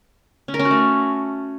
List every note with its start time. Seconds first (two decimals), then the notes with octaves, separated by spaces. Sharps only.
0.48 C#4
0.54 A#4
0.59 C#4
0.65 F#4
0.71 A3